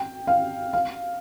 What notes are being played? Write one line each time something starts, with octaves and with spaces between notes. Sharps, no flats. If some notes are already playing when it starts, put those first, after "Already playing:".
Already playing: G5
F5
F5